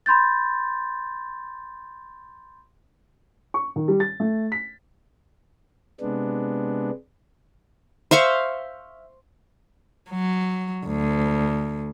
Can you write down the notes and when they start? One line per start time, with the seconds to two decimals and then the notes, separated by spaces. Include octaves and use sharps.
0.06 B5 C6 G6 A6
3.54 C#6
3.76 D#3
3.88 G3
4.00 A6
4.20 A3
4.52 B6
6.00 C3 G#3 B3 D4
8.11 C5 E5 F5 C#6
10.09 F#3
10.86 D2